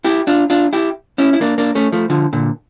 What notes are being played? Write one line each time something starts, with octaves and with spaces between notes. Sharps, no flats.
E4 G4
D4 F4
D4 F4
E4 G4
C#4 E4
E4
A#3 D4
A#3 D4
A3 C#4
F3 A3
D3 F3
A#2 D3